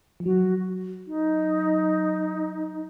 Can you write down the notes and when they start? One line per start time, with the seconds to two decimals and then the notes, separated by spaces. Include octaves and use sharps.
0.20 F3
0.25 F#3 F#4
1.07 D#4